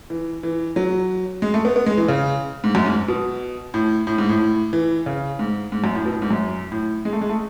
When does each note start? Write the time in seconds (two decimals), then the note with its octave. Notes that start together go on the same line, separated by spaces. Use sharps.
0.10 E3
0.43 E3
0.76 F#3
1.42 G#3
1.54 A3
1.65 B3
1.76 B3
1.86 G#3
1.97 E3
2.08 C#3
2.64 G#2
2.75 F#2
2.86 G#2
3.08 B2
3.74 A2
4.07 A2
4.18 G#2
4.29 A2
4.73 E3
5.06 C#3
5.39 G#2
5.72 G#2
5.84 F#2
5.95 A2
6.06 B2
6.14 A2
6.22 G#2
6.31 F#2
6.72 A2
7.05 G#3
7.13 A3
7.21 G#3
7.29 A3